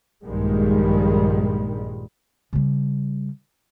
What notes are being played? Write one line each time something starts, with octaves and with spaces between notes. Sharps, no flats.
A#1 G2 A#2 D#3 G3 G#3
C#3 G3